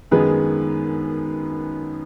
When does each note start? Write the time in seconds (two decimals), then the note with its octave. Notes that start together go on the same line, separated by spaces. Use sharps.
0.11 F#2 D#3 G#3 B3 G#4 B4